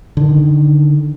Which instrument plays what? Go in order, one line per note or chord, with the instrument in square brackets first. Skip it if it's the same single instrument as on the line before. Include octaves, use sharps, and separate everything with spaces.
[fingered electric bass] D3 D#3